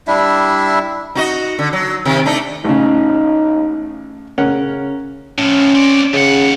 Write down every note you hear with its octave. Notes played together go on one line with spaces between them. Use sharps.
G3 D4 E4 E5
D#4 F#4 D#5
D3
F#3
C3 D#3
A3 D4 D#4
A1 C#3 D#4
C#3 C#4 A#4 F#5
A2 F3 C#4
C4 D5
D#2 C#3 F#5